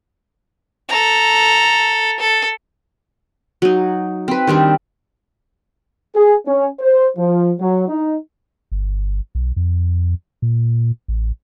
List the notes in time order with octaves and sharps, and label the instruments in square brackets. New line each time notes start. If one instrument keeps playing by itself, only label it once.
[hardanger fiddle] A4 A#5
A4
[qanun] F#3 D#4
C4 B4
D#3 G3 C4 D4
[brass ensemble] G#4
C#4
C5
F3
F#3
D#4
[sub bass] G1
B1
F2
A#2
A1